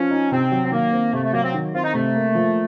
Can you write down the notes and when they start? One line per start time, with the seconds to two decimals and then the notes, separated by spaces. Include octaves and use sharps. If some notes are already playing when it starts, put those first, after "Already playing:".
Already playing: F3 C#4
0.11 D#4
0.32 C3 C4
0.52 F#3
0.65 C4
0.71 D#3 A#3
0.92 C4
1.13 C3 A3
1.24 A3
1.33 F#3 A#3
1.43 C4
1.54 D#3
1.74 C4 F4
1.84 D#4
1.94 C3 A3
2.14 A#3
2.35 F3